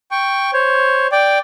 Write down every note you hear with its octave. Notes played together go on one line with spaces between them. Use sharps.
G5 C#6
C5 C#5
D5 G5